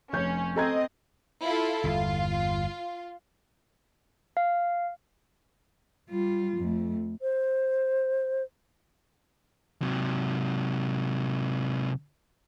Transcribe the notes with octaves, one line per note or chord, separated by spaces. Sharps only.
F1 C#4 C#5 G6
C4 A4 D#5 A#5 G#6
E4 F4 A4
G1 E2 F4
F5
G3 F4
F2 A3
C5
C3 F#3